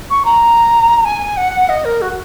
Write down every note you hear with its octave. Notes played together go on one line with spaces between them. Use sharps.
C#6
A#5
G#5
F#5
D#5
A#4
F#4